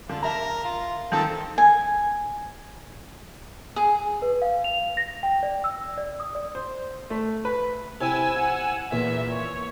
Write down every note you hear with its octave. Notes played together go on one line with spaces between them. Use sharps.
D3 F4
A#4 E5 A5 A#5
F4
D#3 F3 C4 A4 A5
G#5
G#4
B4
F5
F7
A#6
G5
D5
E6
D5
D#6
D5
C5
A3
B4
C3 E4 G#5 E6
F#5
E2 A#2 E5
C#5